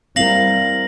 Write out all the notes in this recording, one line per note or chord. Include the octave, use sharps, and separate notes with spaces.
G3 C4 E4 A#4 F5 A#6 F#7